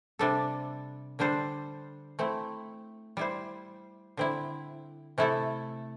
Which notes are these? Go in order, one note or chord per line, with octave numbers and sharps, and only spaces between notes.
C3 G3 D4 A4
D3 G3 D4 A4 C5
A3 C4 E4
G3 E4 C5
D3 C4 E4
C3 A3 E4 A4